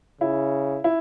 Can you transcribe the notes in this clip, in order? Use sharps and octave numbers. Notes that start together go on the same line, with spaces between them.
C#3 E4
E4